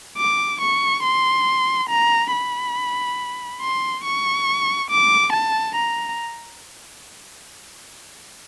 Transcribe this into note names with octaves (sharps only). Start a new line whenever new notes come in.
D6
C#6
C6
A#5
B5
C6
C#6
D6
A5
A#5